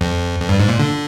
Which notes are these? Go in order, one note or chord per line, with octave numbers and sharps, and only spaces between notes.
F2
F2
G2
G#2
A#2
D3